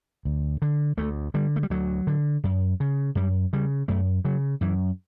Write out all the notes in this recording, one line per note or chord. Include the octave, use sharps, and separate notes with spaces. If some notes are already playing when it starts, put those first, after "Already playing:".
D2
D3
D2 A3
D3 G3
A3
G3
D2 F#3
D3
F#2
C#3
F#2 G3
C#3 G3
F#2 A3
C#3 F#3
F#2 E3